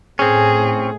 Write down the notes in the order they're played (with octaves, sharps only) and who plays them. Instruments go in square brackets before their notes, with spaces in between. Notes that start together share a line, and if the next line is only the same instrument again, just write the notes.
[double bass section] A2 [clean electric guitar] C4 C#4 [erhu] G#4